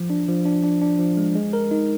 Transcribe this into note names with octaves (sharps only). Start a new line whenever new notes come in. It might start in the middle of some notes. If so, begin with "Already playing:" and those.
Already playing: F3
D4
F3
D4
D4
D4
F3
G#3
G#3
A#4
D#4